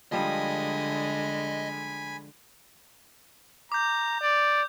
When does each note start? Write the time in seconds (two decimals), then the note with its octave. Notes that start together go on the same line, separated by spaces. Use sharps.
0.12 D3 F3 G3 G#3 D#5 G#5 B5
3.72 A#5 D6 G6
4.21 D5